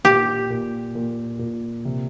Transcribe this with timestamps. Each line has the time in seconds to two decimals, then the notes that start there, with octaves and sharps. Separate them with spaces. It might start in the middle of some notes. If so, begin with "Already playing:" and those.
0.04 A#2 G4
0.50 A#2
0.95 A#2
1.39 A#2
1.85 C3